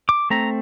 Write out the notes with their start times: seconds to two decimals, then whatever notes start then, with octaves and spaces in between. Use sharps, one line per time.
0.09 D6
0.30 A3 C4 A#5